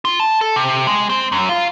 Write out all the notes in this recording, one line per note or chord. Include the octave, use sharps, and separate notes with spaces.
F4
A5
A4
C3
G#3
C4
F#2
F4